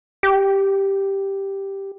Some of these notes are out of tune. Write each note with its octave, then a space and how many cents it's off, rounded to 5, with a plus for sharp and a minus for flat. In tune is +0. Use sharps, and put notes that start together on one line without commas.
G4 +0